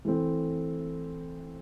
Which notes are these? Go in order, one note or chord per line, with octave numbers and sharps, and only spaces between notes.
E3 A3 C4